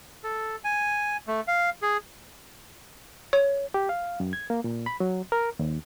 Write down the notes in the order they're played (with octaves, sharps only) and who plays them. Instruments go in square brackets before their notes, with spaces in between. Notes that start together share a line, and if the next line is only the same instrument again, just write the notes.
[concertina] A4
G#5
A3
F5
G#4
[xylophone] C#5
[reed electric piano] G4
F5
F#2
G#6
A#3
A#2
B5
F#3
A#4
D#2